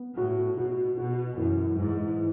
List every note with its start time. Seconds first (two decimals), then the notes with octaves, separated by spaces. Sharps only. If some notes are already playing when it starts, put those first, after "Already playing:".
Already playing: B3
0.17 A2 F#4
0.57 B2 F#4
0.97 B2 F#4
1.37 F#2 E3
1.77 G#2 E3
2.17 E3